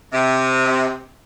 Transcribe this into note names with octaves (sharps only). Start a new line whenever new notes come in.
C3